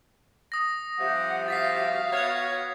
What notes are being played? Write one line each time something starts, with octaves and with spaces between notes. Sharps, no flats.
D#6 A#6
C3 F3 G3 E5 F#5
F#4 F5 A6 B6 C7
B3 C#5 G#6 A6